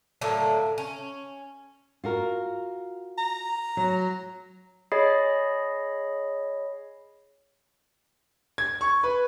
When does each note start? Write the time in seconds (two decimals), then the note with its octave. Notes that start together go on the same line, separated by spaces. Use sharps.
0.21 A2 D3 F#3 A#3
0.78 C#4
2.04 F4 F#4 A#4
3.18 A#5
3.77 F#3
4.92 G#4 C#5 D#5 B5 C7
8.58 G#6
8.81 C#6
9.03 B4